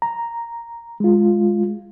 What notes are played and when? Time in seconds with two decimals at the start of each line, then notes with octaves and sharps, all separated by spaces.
0.02 A#5
1.00 G#3 F4